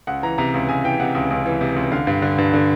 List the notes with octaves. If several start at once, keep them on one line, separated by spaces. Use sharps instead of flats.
C#2 F#5
E3 A#5
C3 A#5
C#2
C#2 G#5
E3 G5
C3 F#5
C#2
C#2
E3
C3
C#2
D3 F5
G2
D3
G2
D3